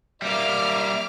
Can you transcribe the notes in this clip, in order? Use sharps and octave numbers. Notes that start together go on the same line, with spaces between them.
G3 A#3 E5 D6 F6